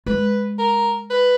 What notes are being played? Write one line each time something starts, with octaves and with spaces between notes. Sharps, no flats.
G#3 B4
A#4
B4